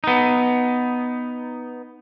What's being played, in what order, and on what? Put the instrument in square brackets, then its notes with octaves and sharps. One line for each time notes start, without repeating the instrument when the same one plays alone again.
[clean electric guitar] B3 D#4